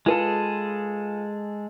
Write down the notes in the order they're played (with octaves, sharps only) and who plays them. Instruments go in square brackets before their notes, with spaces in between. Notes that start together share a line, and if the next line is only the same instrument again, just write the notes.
[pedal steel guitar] G#3 G#4 A4 [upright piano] F4 B4 A5